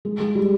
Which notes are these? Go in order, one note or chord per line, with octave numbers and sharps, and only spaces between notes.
G#3
G#3
G3